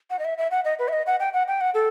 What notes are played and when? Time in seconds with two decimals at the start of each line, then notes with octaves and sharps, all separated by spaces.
0.10 F#5
0.19 D#5
0.25 E5
0.38 E5
0.51 F#5
0.65 D#5
0.79 B4
0.88 E5
0.93 D#5
1.06 F#5
1.20 G5
1.33 F#5
1.48 G5
1.61 F#5
1.74 A4